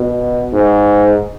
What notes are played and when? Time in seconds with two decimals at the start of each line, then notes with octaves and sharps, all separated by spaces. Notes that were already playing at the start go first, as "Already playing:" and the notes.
Already playing: B2
0.53 G#2